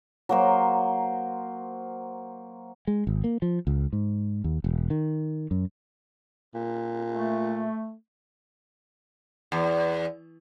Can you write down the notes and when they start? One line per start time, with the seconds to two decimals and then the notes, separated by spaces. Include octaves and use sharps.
0.29 F#3 A#3 C5
2.87 G#3
3.07 G#1
3.24 A#3
3.42 F3
3.67 C#2
3.93 G#2
4.44 D#2
4.64 E1
4.90 D#3
5.51 F#2
6.55 A#2
7.14 A3
9.52 E2